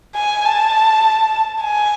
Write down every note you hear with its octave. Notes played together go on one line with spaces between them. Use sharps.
G#5
A5
G#5